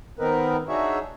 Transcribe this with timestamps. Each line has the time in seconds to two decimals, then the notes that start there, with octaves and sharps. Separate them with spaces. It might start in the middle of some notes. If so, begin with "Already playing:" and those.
0.19 D#3 B3 C4 D#4 A#4 B4
0.68 D4 D#4 F#4 G#4 C#5 E5